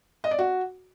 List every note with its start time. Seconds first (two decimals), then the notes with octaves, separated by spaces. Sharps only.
0.24 D#5
0.31 D5
0.39 F#4